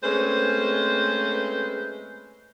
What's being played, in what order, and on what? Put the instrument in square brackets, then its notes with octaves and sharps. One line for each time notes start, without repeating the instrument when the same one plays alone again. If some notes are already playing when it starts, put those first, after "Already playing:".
[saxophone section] G#3 A3 C4 C#4 B4 C5